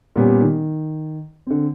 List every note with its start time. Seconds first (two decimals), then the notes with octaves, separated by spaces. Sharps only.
0.16 A#2 G3 B3 C#4 G4
0.41 D#3
1.47 D3 C4